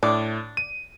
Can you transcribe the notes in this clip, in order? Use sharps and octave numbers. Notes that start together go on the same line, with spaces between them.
A2 D4
D#7